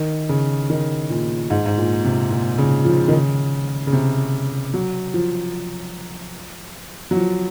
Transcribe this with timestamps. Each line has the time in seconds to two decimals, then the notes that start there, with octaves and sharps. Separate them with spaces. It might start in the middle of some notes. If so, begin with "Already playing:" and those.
Already playing: D#3
0.29 C#3
0.70 D#3
1.10 A#2
1.50 G#2
1.66 G#2
1.77 A#2
2.05 C3
2.31 A#2
2.58 C#3
2.85 F3
3.08 D#3
3.13 C#3
3.87 C#3
3.93 C3
4.74 F#3
5.14 F3
7.11 F#3
7.16 F3